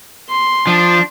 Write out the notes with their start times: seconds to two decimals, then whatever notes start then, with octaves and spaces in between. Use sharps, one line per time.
0.29 C6
0.67 F3 D4